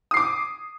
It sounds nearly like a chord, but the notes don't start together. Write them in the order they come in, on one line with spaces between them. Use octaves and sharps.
D#6 C7 D6